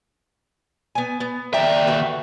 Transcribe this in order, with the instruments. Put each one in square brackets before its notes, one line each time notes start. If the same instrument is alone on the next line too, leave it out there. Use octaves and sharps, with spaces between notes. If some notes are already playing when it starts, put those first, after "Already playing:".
[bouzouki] B3 G#5
B3
[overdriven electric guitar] D#2 E5 [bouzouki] A#4 D5 G5
[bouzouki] D3 F#4 B4